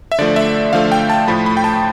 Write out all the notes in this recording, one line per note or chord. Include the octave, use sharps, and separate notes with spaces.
E5
D3 F3 A3 D5
E5
D3 F3 A3 F5
G5
A5
A2 F3 A3 B5
B5
G5
A5